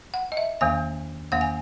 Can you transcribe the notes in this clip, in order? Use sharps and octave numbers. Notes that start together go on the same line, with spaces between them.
F#5
D#5
E5
E2 D#3 A#3 G#5
E2 D#3 A#3 F#5
G#5